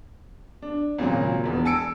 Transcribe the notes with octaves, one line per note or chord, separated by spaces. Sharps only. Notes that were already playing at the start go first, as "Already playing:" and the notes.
D4
G#1 A#2 C#3 F#3
E1 E2
G#5 A5 E6 C#7 D7